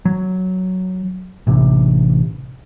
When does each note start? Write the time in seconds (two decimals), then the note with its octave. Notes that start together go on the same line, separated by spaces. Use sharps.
0.05 F#3
1.47 A1 C3